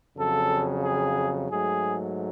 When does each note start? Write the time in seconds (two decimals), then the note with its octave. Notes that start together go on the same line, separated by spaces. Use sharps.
0.17 F2 C#3 F#3 A4
0.83 G#4
1.50 G#2 F#3 A3 G#4